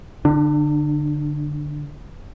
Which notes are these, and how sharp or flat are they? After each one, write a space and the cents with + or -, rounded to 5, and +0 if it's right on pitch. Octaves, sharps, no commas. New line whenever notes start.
D3 +0 D4 +35